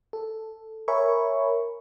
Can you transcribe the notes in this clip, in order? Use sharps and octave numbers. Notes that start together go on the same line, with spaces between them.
A4
A#4 C#5 E5 G#5 B5 C#6